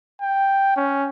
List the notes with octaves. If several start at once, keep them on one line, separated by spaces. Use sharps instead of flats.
G5
C#4